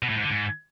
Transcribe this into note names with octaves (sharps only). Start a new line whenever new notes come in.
B2
A2
G#2
D3
G#2